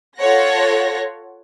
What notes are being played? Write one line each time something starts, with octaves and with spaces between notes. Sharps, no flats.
F4 A4 C#5 F#5 A#6